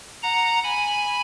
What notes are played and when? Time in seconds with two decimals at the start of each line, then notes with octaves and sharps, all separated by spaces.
0.23 F#5 A#5
0.64 G#5 B5